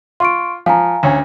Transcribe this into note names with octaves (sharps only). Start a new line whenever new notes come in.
F4 C6 C#6 D7
F3 F5 G#5 A#5
D2 C#4